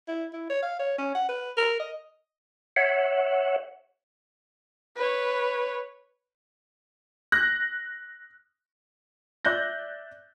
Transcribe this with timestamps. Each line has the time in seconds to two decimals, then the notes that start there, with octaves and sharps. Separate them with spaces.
0.08 E4
0.33 E4
0.50 C#5
0.63 F5
0.79 C#5
0.98 C#4
1.15 F#5
1.29 B4
1.57 A#4
1.80 D#5
2.76 C#5 E5 F#5
4.96 B4 C#5
7.32 F#6 A#6
9.45 D5 E5 F#6 G6 A#6